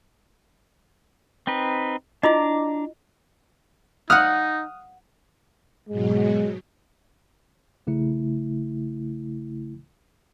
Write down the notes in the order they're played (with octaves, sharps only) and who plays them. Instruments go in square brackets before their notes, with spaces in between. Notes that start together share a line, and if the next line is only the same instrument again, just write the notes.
[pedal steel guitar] C4 D#4 B4
[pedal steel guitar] D4 A#5 D6 [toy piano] E4 F4 D#5
[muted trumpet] D#4 [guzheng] F5 F#5 [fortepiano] D#6 F6 F#6
[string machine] G#2 B2 F#3 [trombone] G#3
[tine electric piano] A#1 C#3 A3 E4